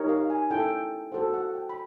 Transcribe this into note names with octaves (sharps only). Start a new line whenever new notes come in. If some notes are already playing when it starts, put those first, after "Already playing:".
Already playing: D#4 G4 A#4 C#5
F5
G#5
C#4 E4 A4 G5
F#4 A4 C5 F#5
F#5
G5
B5